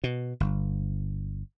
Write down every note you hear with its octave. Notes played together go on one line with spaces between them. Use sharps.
B2
G1